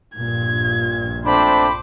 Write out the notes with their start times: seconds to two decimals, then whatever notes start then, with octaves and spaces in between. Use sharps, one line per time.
0.16 A#1 G2 A#2 G#6
1.25 A3 C4 D4 C5 B5 D6